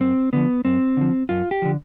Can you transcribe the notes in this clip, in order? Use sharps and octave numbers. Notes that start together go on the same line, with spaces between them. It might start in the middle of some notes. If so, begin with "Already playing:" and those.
F#2 C4
D3 F3 B3
F#2 C4
D3 F3
F#2 F4
G4
D3 F3